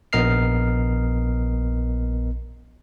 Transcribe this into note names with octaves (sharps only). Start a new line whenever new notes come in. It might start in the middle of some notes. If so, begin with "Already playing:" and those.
A#1 B3 A#4 D#5 F6 C7